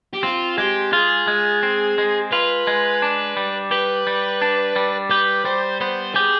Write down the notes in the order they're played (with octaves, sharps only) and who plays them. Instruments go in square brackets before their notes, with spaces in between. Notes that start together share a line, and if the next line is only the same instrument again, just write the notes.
[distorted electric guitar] G4
[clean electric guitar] C4 [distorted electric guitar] F4
[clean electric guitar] G#3 [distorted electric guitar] G4
[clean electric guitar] F4 [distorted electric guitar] G#4
[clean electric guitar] G#3
C4
G#3
[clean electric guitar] F4 [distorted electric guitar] B4
[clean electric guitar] G#3
D4
G3
[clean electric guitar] G4 [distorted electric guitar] B4
[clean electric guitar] G3
D4
G3
[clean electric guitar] G4 [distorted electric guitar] B4
[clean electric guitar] G3 [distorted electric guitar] C5
[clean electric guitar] B3 [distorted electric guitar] C5
[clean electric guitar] G4 [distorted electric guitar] G#4